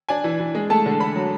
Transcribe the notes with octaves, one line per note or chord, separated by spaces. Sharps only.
D4 G#5
E3
E3
G#3
A3 A5
D3
D3 B5
F#3